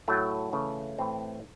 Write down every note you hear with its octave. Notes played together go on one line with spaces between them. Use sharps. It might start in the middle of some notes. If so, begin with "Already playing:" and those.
A2 F#3 A3
C#3 E3 A3
A2 E3 A3 C4